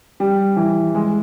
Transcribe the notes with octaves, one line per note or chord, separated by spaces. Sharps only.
G3
E3
G#3